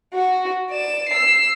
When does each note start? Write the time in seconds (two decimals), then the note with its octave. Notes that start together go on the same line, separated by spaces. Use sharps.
0.14 F#4
0.70 D5 E7
1.09 E6 C7